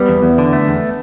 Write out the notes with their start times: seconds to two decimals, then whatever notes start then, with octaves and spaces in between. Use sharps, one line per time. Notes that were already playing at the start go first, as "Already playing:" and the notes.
Already playing: G3 B3
0.09 E2
0.23 E2
0.38 D3
0.53 A3
0.68 E2